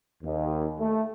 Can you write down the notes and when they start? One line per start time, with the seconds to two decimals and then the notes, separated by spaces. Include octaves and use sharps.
0.23 D#2
0.79 A3